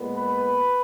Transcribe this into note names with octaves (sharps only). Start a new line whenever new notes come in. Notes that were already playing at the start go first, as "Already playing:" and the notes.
Already playing: A#2 G#3 B3
B4